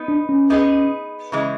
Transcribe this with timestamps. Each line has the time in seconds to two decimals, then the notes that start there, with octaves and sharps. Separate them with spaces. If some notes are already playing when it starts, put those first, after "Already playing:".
Already playing: B3 D#4 B4
0.08 D4
0.29 C#4
0.50 B3 D#4 G#4 B4 D#5
1.32 C#3 E3 G#3